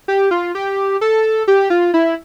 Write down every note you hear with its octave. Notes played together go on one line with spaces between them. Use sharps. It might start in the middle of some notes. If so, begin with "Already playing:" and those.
G4
F4
G4
A4
G4
F4
E4